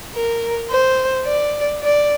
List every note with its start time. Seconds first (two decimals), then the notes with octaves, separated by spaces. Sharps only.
0.14 A#4
0.70 C5
1.25 D5
1.82 D5